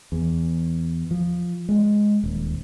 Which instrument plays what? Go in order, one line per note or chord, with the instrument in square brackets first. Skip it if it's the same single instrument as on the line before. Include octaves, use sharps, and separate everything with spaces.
[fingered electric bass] E2
F3
G#3
D#1